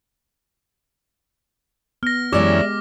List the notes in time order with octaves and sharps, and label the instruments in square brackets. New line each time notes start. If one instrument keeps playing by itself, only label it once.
[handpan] B3 [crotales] F6 A#6
[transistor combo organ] F#2 E3 C#4 [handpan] G#3 G4 [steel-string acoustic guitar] D5 E5 [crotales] D6